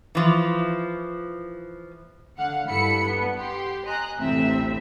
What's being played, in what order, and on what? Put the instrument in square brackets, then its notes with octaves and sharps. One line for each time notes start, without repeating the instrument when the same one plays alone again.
[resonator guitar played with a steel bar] E3 F3
[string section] D3 F5 F#5
G2 E4 A4 B5 C#7
B3
G4 C6
D#5 G#5 A#5 F#6
A1 D2 A2 C3 C4 E5